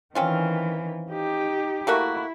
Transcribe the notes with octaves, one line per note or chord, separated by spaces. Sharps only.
D#3 E3 C4 C#4 F4
D#4 G4
A3 A#3 E4 F#4